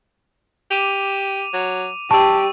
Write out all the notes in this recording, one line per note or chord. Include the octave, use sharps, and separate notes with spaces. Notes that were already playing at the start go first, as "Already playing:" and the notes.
G4 D6 D#7 F7
F#3
G3 G4 A5 C#6 E6